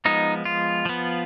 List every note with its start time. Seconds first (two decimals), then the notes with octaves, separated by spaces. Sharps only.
0.05 F3 G#3 B3 D#4
0.45 F4
0.85 F3 B3